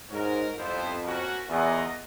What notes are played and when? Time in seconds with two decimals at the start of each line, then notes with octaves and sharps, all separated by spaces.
0.10 G#2 C#4 F#4 A#4
0.57 F2 G3 B3 E4 A4 C5
1.03 A#3 C#4 F#4
1.50 E2 F4 A#4 D#5 F#5